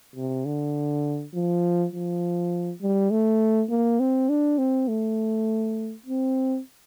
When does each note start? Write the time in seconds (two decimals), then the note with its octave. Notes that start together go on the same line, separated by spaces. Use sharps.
0.16 C3
0.45 D3
1.34 F3
1.93 F3
2.82 G3
3.11 A3
3.70 A#3
4.00 C4
4.29 D4
4.59 C4
4.88 A3
6.06 C4